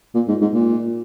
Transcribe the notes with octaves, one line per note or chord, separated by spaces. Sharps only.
A#2
G#2
G#2
A#2